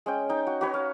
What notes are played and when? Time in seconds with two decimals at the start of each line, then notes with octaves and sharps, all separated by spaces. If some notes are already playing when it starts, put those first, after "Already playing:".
0.06 G#3 C#4 G5
0.29 D#4 G5
0.47 F#4
0.61 F#4 B4 C#5
0.74 F5